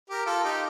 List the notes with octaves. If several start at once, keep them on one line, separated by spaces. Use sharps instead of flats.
G4 A#4
F4 A4
D#4 G4